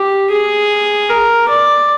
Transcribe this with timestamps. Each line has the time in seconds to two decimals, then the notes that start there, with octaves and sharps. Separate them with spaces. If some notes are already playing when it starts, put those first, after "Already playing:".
Already playing: G4
0.31 G#4
1.09 A#4
1.49 D5